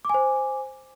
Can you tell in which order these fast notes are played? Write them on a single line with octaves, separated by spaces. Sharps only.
D6 G#5 C5